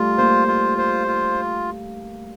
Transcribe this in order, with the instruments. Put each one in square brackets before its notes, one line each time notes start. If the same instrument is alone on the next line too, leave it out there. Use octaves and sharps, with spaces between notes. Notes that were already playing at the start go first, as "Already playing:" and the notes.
Already playing: [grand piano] G3 A3 [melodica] F4
[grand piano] A#3 [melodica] C5
[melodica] F4
C5
F4